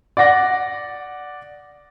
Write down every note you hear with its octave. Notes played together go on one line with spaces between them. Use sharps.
D5 F#5 A#6